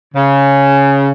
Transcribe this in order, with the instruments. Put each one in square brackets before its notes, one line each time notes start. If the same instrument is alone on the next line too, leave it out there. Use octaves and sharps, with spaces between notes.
[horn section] C#3